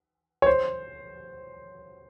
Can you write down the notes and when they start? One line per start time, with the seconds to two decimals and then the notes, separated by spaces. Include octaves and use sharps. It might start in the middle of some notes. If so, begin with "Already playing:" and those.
0.42 C#5
0.46 C5